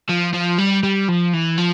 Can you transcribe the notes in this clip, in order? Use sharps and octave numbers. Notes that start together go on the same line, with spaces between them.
F3
F3
G3
G3
F3
E3
F3